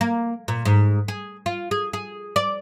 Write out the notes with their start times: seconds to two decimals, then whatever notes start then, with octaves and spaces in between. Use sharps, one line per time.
0.01 A#3
0.48 A#2
0.65 G#2
1.08 G#4
1.46 F4
1.71 G#4
1.93 G#4
2.36 D5